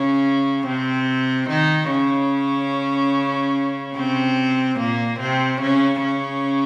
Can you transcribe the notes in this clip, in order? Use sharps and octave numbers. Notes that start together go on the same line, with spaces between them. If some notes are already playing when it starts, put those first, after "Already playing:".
Already playing: C#3 C#4
C3 C4
D#3 D#4
C#3 C#4
C3 C4
A#2 A#3
C3 C4
C#3 C#4
C#3 C#4